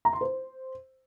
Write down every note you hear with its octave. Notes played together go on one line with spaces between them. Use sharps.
A#5
C6
C5